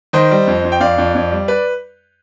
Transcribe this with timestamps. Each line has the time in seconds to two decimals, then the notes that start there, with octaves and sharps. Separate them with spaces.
0.13 D#3 C5 D#5
0.31 G3
0.47 F2
0.64 F2
0.72 G5
0.80 F2 D5 F5
0.98 F2
1.15 F2
1.31 G3
1.48 B4 D5